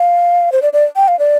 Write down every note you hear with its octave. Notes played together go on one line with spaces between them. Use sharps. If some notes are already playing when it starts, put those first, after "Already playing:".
Already playing: F5
C5
D5
D5
G5
F5
D5